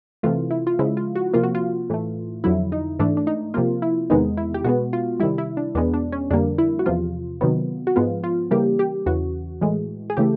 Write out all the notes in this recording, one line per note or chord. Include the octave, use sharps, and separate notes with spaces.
C3 E3 A3 F4
E4
F4
C#3 F3 G#3 E4
F4
F#4
C3 F3 A#3 F4
F#4
F4
A2 E3 A3
F2 D3 F#3 E4
D#4
G#2 E3 A3 D4
D4
D#4
C3 F3 A#3 F4
E4
E2 C3 D#3 G#3 B3 D#4
E4
G4
B2 G#3 B3 F#4
F4
C3 D#3 G3 E4
E4
D4
E2 B2 G#3 B3 D4
D4
C#4
F2 D3 G3 A#3 D4
E4
F#4
E2 C3 F3 F4
C3 D#3 F#3 B3
F#4
G#2 F3 G#3 B3 F4
F4
C#3 E3 G3 A#3 G4
G4
E2 C#3 E3 F#4
A2 E3 G#3
G#4
C#3 E3 A3 G4